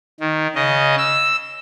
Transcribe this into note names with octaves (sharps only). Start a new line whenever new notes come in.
D#3
C#3 D#5
E6